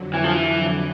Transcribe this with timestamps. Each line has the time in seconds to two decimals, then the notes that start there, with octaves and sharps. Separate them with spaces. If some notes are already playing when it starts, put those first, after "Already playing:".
Already playing: F2 D3 F#3
0.14 E3
0.24 F3
0.33 E3